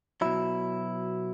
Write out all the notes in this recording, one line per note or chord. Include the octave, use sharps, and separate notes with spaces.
B2 F#3 E4